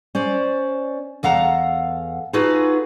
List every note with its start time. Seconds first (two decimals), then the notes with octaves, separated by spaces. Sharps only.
0.15 C#4 C5 D5
1.23 E2 A4 F5 F#5 A#5
2.33 D#4 F4 F#4 G#4 A4 B4